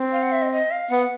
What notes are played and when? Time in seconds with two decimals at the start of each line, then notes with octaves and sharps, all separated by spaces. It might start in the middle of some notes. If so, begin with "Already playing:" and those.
Already playing: C4
0.12 F5
0.23 F#5
0.32 E5
0.42 D#5
0.52 D#5
0.71 F5
0.90 B3 F#5